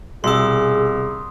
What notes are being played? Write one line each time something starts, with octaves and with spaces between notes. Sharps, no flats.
C2 B2 G#4 C6 D#6 E6